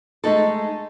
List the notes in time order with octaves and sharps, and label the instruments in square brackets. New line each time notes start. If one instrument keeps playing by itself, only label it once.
[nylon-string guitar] G#3 A3 D#4 A4